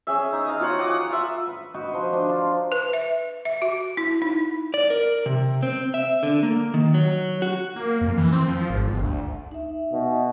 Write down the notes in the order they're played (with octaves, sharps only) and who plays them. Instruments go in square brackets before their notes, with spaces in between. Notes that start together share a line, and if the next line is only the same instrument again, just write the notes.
[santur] C#4 G#4 E5
D#4
D#5 F5 A#5
F4 F#4 C#5 F#5
F#5 D6 D#6
F4 E5
[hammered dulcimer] B4
D#4 F#4
F3 A#4 C5 D#5
D4
F4
[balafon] B4
E5
E5
F#4
E4
D#4
[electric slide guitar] D5
A#4
C3
C4
E5
D3
A#3
D#3
F#3
F#4
[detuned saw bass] A#3
F2
E3
C4
F3
G#1
G1
D2
[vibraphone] D#4 E5
[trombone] B2